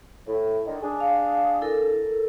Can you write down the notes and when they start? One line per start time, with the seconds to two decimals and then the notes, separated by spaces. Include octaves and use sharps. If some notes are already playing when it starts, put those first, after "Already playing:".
0.28 A2
0.67 D3 D#3
0.82 D4 G#4
1.00 F5
1.62 E4 A4 A#4